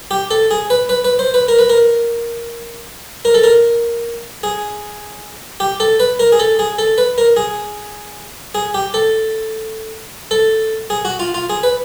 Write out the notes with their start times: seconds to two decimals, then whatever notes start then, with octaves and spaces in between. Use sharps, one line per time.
0.11 G4
0.31 A4
0.51 G#4
0.70 B4
0.89 B4
1.05 B4
1.19 C5
1.34 B4
1.48 A#4
1.59 B4
1.69 A#4
3.25 A#4
3.34 A4
3.43 A#4
4.43 G#4
5.60 G4
5.80 A4
6.00 B4
6.19 A#4
6.32 G#4
6.39 A4
6.59 G#4
6.79 A4
6.98 B4
7.18 A#4
7.37 G#4
8.55 G#4
8.74 G4
8.94 A4
10.31 A4
10.90 G#4
11.05 F#4
11.19 F4
11.34 F4
11.50 G#4
11.63 B4